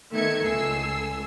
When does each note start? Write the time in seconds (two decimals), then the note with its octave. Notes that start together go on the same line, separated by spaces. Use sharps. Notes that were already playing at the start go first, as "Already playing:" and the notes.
0.11 D#3 A3 B3 E5 G#6 C#7
0.44 C#2 A4 G#5 E6 C7